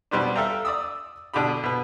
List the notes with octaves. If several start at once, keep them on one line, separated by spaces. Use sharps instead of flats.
B2 G3 B3 C4 D4
A4 E5 F5 G5 A#5
D5 D#6 E6
B2 D3 D4 G4 B5
B2 B4